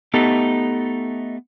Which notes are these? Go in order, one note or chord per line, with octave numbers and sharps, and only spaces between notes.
A3 B3 D#4 G4 A4